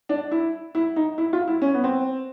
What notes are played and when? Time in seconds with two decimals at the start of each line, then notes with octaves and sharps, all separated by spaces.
0.09 D4
0.31 E4
0.75 E4
0.96 D#4
1.18 E4
1.33 F4
1.48 E4
1.62 C#4
1.74 B3
1.84 C4